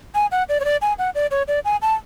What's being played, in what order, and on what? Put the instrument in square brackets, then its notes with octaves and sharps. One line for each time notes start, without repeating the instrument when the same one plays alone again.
[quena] G#5
F#5
D5
C#5
D5
G#5
F#5
D5
C#5
D5
G#5
A5